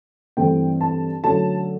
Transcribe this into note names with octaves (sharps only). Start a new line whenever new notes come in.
G2 E3 A3 C4 G5
A5
D3 F#3 A3 C#4 A5